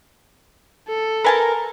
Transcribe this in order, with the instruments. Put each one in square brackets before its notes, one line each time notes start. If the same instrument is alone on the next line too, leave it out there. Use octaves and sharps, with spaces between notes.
[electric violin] A4
[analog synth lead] A#4 [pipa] B4 G#5 A5